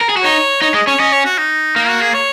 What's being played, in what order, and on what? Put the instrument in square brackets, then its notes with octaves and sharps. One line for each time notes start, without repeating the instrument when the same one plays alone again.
[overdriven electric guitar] A#4
G#4
F#4
[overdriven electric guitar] D#4 [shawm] C#5
[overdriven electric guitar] D#4 [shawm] C#5
[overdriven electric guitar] G#3 [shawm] D#5
[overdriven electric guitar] C#4 [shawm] C#5
[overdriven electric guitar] C#4 [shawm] D#5
[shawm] C#5
F#4
D#4
[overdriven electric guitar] A#3 [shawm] D#4
[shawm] F#4
G#4
C#5